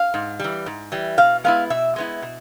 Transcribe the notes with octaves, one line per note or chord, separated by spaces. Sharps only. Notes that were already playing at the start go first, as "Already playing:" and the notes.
Already playing: F5
G#2
E3 G3
G#2
E3 G3
B2 F5
G#3 B3 E4 F5
B2 E5
G#3 B3 E4
B2